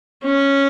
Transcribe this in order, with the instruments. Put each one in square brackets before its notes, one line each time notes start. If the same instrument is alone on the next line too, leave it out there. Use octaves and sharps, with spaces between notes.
[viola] C#4